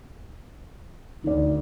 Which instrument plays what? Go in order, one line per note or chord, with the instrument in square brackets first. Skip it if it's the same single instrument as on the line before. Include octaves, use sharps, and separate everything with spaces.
[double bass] D2 [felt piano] D#3 D5